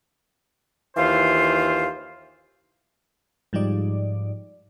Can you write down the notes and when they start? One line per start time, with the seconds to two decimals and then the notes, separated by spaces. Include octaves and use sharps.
0.97 D#2 E3 F4 C5 F5
3.53 G#2 F3 G3 D#4 D5